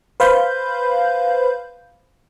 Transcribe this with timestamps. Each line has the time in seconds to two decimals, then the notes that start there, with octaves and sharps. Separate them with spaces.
0.20 B4 C5 F5 B5 G6